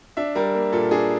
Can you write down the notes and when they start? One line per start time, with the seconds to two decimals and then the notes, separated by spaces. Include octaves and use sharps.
0.17 D4 E5
0.35 G3 A#4
0.55 A#3
0.72 A#2 A4
0.91 D4 G#4